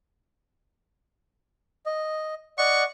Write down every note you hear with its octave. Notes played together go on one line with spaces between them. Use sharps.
D#5
D5 D#5 F#5 C#6